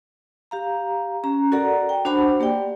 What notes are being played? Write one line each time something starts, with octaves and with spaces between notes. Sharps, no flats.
G4 F5 A#5
C#4 A#5
F#4 A4 A#4 D5 F#5 A#5
G5
D4 F#4 C5 F#5 A5 B5
A#3 G4 D5 G5